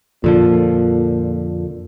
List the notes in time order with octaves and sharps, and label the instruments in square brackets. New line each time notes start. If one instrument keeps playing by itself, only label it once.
[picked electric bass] F2 D3 F3 [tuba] A#2